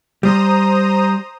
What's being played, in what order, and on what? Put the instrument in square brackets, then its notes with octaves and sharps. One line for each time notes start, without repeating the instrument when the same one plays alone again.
[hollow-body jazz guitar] G3 [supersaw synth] C5 A#5 D#6